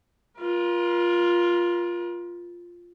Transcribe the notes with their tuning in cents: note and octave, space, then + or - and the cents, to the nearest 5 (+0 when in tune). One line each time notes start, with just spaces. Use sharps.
F4 +0 A#4 +40